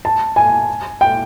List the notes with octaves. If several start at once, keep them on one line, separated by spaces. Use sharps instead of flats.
A5
G#5
G5